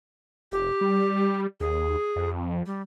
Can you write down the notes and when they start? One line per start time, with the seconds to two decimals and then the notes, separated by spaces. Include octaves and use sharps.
0.52 F1 G4
0.81 G3
1.60 D#2 G#4
2.16 F2
2.66 G3